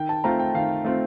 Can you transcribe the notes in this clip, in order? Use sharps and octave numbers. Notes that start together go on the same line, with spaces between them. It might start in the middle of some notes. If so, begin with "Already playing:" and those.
Already playing: D#3 G5
A5
A3 C4 F4 A#5
G5
D#3 F5
A3 C4 F4